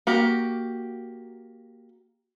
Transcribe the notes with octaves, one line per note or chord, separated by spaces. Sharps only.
A#3 F#4 G4